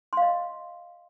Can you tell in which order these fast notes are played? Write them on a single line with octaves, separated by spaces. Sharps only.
C6 F5 D#5